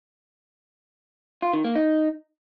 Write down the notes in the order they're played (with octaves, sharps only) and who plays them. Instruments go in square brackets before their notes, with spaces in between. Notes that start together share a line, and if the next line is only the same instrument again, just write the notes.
[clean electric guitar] F4
D#3
A#3
D#4